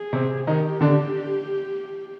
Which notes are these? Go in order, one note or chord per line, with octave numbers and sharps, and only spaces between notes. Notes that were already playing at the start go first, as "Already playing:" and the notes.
Already playing: G#4
C3 C4
D#3 D#4 G4
D3 D4